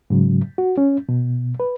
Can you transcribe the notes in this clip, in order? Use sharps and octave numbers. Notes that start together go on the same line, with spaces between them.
G#2 C#3 F#3
F#4
C#4
B2
B4